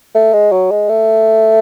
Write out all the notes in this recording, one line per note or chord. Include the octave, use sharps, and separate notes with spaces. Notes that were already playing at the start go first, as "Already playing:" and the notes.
A3
G#3
F#3
G#3
A3